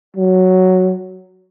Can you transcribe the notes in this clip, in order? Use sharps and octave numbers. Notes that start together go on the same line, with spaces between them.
F#3